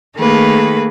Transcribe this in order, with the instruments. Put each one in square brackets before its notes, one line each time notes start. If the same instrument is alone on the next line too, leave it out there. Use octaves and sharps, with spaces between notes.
[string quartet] D#3 A3 A#3 G#4 A4 B4